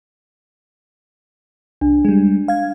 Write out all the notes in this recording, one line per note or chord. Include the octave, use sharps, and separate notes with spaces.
C2 D4
G3 G#3
F5 G#6